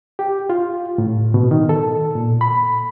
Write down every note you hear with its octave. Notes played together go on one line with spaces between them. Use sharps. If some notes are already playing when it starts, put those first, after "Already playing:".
G4
F4
A2
B2
D#3
A4
A#2
B5